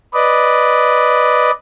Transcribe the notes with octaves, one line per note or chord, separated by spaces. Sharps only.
B4 D5 D#5